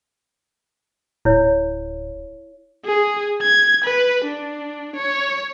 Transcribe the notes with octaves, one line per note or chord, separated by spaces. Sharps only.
D1 E4 C#5
G#4
G#6
B4
D4
C#5